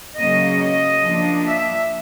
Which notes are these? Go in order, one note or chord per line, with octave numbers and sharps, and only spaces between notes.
C#3 F#3 A#3 D#5
D#5
F3 A#3 D4
E5